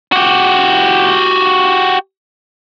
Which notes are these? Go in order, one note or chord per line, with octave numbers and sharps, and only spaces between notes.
F#4 G4